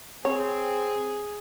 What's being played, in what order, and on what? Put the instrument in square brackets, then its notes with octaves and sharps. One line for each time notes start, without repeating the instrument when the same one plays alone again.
[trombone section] C4 [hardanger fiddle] G#4 [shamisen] C#5